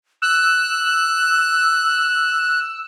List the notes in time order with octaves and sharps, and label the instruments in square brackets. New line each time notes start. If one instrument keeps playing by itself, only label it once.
[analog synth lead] E6 [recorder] F#6